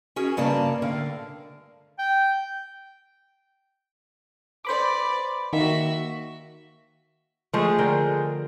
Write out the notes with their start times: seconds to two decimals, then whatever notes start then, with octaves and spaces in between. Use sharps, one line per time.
0.16 C#4 F#4 G#4 A#4
0.37 G2 C#3 A#3 D5 A5
0.82 A2 D3 A#4 F5
1.99 G5
4.65 B4 C5 D5 B5 D6
5.53 D#3 A#3 F#4 E5
7.53 F3 G#3 A3 G#4
7.78 D3 A#4 G5